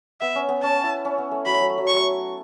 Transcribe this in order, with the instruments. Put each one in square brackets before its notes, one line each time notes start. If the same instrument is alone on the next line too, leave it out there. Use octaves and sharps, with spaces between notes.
[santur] B3 [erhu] E5
[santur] C#4
B3
[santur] C#4 [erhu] A5
[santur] E4
C#4
B3
A3
[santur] F#3 [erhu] B5
[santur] A3
F#3
A3
F#3
[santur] A3 [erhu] C#6
[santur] F#3